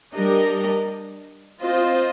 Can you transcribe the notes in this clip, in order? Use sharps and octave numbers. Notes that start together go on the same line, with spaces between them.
G3 D4 G4 A#4 D#5
C4 F4 C5 D#5